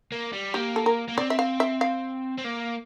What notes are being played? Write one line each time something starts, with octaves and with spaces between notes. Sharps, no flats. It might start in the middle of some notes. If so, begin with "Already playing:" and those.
A#3
G3
A#3 G4
A4
A#4
A#3
C4 D5
E5
F5
E5
F5
C4
A#3